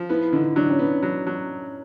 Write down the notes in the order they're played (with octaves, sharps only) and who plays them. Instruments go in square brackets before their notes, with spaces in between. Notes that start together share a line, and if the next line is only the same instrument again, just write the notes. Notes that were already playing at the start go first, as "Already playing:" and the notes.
Already playing: [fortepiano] F3
[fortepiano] B3 [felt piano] E4
[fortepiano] D3 [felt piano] D#4
[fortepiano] F#3 [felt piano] D4
[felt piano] C#4
[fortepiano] B3 [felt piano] D4
[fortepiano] F#3
F#3